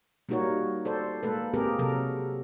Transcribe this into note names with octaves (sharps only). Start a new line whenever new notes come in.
G3 A#3 D#4 F#4 A#4 C#5
A4 C5 D5
G#3 A#3 A4 B4
A#3 C4 G4 G#4 A#4
C3 F#3 A4 A#4